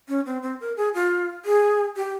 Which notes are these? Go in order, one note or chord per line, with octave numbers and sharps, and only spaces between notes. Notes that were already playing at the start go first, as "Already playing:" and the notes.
C#4
C4
C4
A#4
G#4
F4
G#4
G4